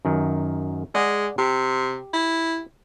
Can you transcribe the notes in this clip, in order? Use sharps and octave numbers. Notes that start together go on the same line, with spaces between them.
F#2 D#3
G#3 G#4 D5 F#5
C3 G4
E4